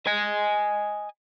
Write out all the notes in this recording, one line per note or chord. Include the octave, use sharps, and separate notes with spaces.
D#5 G#5